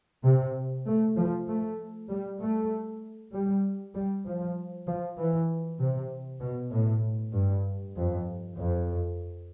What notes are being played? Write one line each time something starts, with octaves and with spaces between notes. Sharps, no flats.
C3
A3
F3
A3
G3
A3
G3
G3
F3
F3
E3
C3
B2
A2
G2
F2
F2